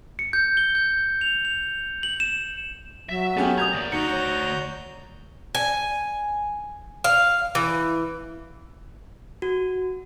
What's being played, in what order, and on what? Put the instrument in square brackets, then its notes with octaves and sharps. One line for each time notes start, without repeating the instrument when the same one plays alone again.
[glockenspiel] C#7
G6
G7
G6
F7
F7
F#7
E7
[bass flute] F#3 [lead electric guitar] E5
[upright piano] A3 C#4 G4 [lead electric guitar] B3
[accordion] A#3 [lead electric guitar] A#5 [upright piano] D#6 G6 G#6
[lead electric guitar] D2 D5
[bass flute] D#4 [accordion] F#4 A#5 G6 [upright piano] C#7
[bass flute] C#5
[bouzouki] G#5
F5
E3
[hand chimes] F#4